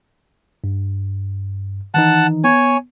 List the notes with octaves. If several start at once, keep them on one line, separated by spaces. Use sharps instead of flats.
G2
D#3 E3 D#4 F#5 A5
B3 C#5 G#5